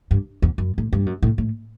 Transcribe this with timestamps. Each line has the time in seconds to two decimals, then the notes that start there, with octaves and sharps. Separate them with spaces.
0.11 G2
0.42 E2
0.58 F#2
0.78 A2
0.93 G2
1.06 F#2
1.23 A2
1.38 A2